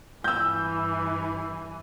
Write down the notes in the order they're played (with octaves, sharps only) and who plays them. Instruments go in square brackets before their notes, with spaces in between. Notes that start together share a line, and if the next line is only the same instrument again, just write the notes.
[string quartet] G2 E3 G#5 [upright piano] E6 G6